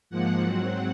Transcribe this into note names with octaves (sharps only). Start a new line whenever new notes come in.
G#2 F3 A#3 F#5
G#2 F#3 C4 F#5